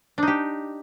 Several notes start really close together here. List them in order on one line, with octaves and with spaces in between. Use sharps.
D4 D#4 G4